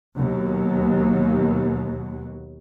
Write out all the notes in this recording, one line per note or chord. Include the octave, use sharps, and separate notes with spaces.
D#2 B2 F#3